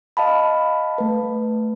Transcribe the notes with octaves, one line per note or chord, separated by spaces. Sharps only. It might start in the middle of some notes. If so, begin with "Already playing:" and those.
D#5 F5 A5 B5
A3 B4